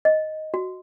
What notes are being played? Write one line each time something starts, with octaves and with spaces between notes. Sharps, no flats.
D#5
F#4